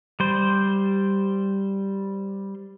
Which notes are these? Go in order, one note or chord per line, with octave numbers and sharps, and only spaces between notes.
G3 C5